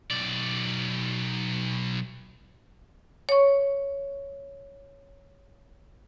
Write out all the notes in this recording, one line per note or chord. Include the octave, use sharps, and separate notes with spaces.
B1 D5
C#5 C#6